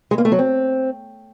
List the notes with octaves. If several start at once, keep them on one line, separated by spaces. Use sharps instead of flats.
G#3
A#3
A3
F#3
C4